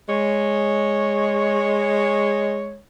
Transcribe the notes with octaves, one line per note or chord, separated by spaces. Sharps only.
G#3 C#5